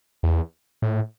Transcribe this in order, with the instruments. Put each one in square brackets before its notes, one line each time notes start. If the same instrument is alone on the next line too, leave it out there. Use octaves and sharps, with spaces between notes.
[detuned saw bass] E2
A2